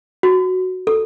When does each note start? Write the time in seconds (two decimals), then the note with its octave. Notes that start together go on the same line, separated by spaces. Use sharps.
0.23 F#4
0.87 A4